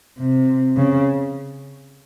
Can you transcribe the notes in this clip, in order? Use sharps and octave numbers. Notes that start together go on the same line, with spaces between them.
C3
C#3